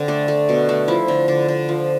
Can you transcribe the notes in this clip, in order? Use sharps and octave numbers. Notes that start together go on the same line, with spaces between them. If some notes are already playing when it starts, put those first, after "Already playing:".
Already playing: D3 C4
A3 D4
A3
B2
A3
F3 E4
D3
D3
D3
F3